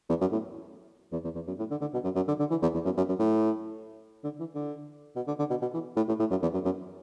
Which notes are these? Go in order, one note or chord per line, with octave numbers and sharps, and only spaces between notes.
E2
F#2
A2
E2
E2
E2
F#2
A2
D3
D3
B2
F#2
F#2
D3
D3
E3
E2
E2
F#2
F#2
F#2
A2
D3
E3
D3
B2
D3
D3
B2
B2
E3
A2
A2
A2
F#2
E2
F#2
F#2